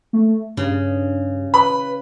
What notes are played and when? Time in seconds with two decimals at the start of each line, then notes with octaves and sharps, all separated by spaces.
0.13 A3
0.57 G2 C#3
1.54 B4 B5